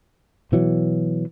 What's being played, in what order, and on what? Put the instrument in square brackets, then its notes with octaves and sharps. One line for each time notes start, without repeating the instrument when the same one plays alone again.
[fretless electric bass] B2 E3 F#3